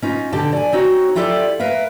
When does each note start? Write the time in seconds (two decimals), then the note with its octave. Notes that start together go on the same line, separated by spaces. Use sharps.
0.02 C#4 D#4 F4
0.32 B2 D3 G4 A5
0.53 D5 G#5
0.72 C4 D#4 F#4 C#5
1.15 E4 F4 G4 A4 C5 D5
1.60 A#4 B4 E5 F5